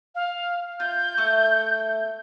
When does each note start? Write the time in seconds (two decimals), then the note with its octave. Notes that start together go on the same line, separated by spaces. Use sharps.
0.15 F5
0.80 F4 G6
1.17 A3 C#6